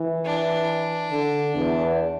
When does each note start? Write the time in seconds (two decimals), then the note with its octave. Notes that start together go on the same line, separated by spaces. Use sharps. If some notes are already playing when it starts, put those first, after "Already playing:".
Already playing: E3
0.25 D4
1.11 D3
1.55 E2